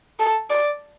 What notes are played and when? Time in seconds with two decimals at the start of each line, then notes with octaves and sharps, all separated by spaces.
0.19 A4
0.50 D5